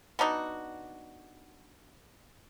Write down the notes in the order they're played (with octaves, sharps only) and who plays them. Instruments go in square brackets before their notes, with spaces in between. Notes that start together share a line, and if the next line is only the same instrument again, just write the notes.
[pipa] B3 D4 D#4 F#4